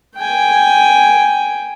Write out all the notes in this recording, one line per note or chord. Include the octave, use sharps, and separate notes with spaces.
G5 G#5